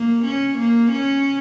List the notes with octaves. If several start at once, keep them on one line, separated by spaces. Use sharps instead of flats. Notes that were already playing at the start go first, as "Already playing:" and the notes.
Already playing: A#3
C#4
A#3
C#4